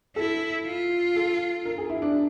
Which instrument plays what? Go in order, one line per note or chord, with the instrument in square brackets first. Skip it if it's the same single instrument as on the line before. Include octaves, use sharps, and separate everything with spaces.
[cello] E4 [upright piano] A4
[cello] F4
[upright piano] A4
A#4
G#4
E4
D4